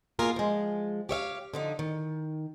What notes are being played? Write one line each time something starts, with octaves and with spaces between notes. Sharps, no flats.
B2 A#3 F4 G#4 A#4
F3 G#3
G4 C#5 E5 F5
D3 F3 D#4
D#3